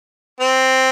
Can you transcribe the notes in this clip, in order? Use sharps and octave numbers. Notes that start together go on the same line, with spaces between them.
C4